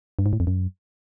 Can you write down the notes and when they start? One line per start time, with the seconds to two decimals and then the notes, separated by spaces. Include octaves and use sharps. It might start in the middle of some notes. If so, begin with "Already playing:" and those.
0.19 G2
0.26 G#2
0.33 A2
0.40 F2
0.47 F#2